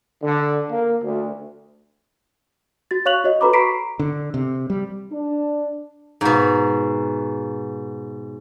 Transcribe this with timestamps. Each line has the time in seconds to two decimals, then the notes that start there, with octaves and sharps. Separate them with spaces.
0.22 D3
0.70 A#3
1.02 D2
2.91 F#4 A6
3.06 C#5 F5 C#6 F#6 F7 F#7
3.24 F#4 C#5 D#5
3.41 F#4 A4 B4 A#5 B5 D6
3.53 A#5 B5 C#6 B6 C7 D7
3.99 D3
4.34 C3
4.70 G3
5.11 D4
6.21 G#2 B2